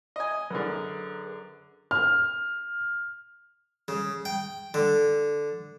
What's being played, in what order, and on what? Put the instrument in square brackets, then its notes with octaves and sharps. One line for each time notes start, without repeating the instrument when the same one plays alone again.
[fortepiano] D#5 G#5
[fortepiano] F#2 D3 [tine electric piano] G#4 A#4 B4
[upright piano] F6
[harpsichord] C#3
G5
D3